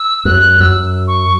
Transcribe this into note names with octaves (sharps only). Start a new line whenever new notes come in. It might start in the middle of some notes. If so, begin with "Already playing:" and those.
Already playing: E6
F#2 F#6
F#2 E6
C#6